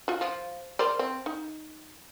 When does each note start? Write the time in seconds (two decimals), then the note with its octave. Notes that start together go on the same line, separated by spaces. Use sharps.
0.08 F4 F#4
0.21 F3
0.79 A#4 C5 D5
0.99 C4
1.26 D#4